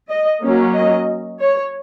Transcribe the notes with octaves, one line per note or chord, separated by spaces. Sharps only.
D#5
F#3 A#3 C#4
D#5
C#5